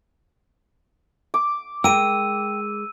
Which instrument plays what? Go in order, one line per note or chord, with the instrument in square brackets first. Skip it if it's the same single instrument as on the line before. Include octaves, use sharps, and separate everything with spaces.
[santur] D6
[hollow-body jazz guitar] G#3 A#4 [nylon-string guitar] G5 [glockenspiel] E6 D#7